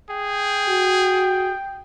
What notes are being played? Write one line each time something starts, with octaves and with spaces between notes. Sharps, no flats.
G#4 G5
F#4